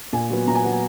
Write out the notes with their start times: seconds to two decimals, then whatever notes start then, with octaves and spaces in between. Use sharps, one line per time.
0.13 A#2 G#5
0.30 F#3 B3
0.47 A#2 A#5
0.55 G#5
0.63 F#3 B3 F#5
0.72 G#5